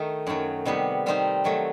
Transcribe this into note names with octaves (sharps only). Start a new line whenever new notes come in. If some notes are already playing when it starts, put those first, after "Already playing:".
Already playing: D#3 A3 D#4
F#2 D#3 F#3
C3 D#3 G3 B3
D#3 G3 C4 D#4
D#3 F#3 A3